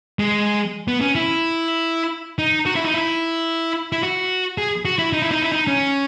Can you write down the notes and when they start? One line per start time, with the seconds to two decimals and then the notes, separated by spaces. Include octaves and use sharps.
0.19 G#3
0.88 B3
1.01 C#4
1.15 E4
2.39 D#4
2.66 F#4
2.75 E4
2.85 D#4
2.94 E4
3.92 E4
4.03 F#4
4.58 G#4
4.85 F#4
4.99 E4
5.13 D#4
5.22 E4
5.32 D#4
5.42 E4
5.52 D#4
5.67 C#4